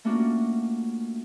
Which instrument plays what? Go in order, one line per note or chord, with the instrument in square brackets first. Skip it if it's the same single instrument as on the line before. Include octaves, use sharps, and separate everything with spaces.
[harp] A3 A#3 C#4 D4 F4 F#4